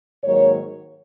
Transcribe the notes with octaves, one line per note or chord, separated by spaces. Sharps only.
G#2 D#3 F#3 A#3 C#5